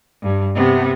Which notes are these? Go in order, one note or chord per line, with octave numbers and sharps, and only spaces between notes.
G2
C3 B3